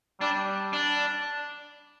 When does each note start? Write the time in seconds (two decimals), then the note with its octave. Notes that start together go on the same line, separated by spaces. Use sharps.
0.20 G3 D4
0.73 D4